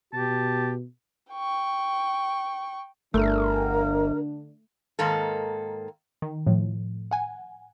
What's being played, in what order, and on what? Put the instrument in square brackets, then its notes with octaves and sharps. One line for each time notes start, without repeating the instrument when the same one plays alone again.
[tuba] B2 [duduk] G4 [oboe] A5
[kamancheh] G5 C#6
[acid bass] G1 [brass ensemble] D3 D4 [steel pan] A3 [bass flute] A#4
[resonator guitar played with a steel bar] G#2 D#3 A#3 A4
[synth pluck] D#3
A2 F3
F#5 G#5